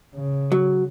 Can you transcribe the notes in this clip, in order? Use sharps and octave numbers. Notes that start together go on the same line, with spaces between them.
C#3
F#3